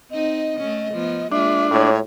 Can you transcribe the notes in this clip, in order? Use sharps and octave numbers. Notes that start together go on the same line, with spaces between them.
C4 D#4 D#5
A3 C#4
F3 B3
G#3 A#3 D4 F4 E5
A2 C#5